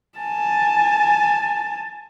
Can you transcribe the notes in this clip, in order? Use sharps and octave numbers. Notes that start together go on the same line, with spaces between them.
G#5 A5